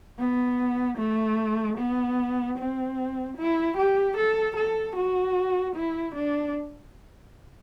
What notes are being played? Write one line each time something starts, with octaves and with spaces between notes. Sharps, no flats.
B3
A3
B3
C4
E4
G4
A4
A4
F#4
E4
D4